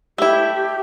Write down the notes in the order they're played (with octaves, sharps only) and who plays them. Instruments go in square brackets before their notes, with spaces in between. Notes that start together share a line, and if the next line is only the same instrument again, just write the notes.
[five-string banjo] A3 E4 [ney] G4